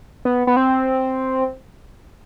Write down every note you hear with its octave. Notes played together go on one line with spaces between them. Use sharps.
B3
B3
C4